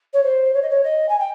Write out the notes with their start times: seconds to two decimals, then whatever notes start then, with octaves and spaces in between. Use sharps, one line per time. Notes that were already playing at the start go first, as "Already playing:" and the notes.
0.13 C#5
0.23 C5
0.53 C#5
0.62 D#5
0.69 C#5
0.83 D#5
1.08 G#5
1.19 G5